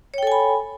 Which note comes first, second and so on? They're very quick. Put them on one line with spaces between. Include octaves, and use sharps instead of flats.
C#5 G5 A4 G#5 B5